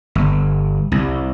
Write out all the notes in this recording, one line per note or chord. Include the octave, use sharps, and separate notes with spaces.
G1
C2